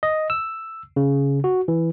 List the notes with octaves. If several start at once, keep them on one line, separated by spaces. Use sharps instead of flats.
D#5
E6
C#3
F#4
E3